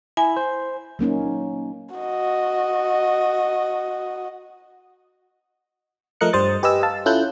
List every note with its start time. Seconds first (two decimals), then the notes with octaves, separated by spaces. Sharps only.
0.17 E4 G#5
0.37 C5
0.99 F#3 A#3 C#4 D#4
1.95 F#4 D#5
6.21 F3 A3 A#4 D#5 F#6 C#7
6.33 G2 G3 C5 D#6 A6
6.63 G4 B4 D#5 G#5 E6
6.83 F5 A5 E6
7.06 C#4 E4 F4 A4 F#6 G6